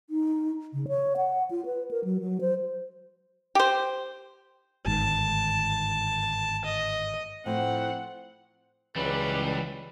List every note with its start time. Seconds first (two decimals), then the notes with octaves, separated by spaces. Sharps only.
0.10 D#4
0.73 C#3
0.88 C#5
1.17 F#5
1.51 F4
1.66 B4
1.91 A#4
2.04 F#3
2.21 F#3
2.41 C5
3.55 G4 C5
4.86 G1 G#2 D#3 A5
6.64 D#5
7.46 A2 F3 C4 F#5
8.96 C#2 E3 F#3 G3 B4 F#5